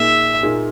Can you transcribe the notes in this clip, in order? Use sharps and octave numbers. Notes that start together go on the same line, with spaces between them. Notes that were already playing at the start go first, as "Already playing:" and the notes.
Already playing: A#2 A#3 D#4 G#4 E5
A#2 A#3 D#4 G#4